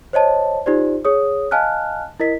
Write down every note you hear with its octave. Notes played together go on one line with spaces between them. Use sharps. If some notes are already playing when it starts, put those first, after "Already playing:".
C5 C#5 D#5 A5
D#4 F4 G4 C5 D5
G#4 C#5 D#6
D#5 F5 G#5 A5 F6 F#6
E4 A#4 D#5 B6